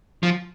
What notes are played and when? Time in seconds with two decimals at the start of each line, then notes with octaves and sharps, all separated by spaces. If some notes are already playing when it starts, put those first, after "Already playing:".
0.23 F3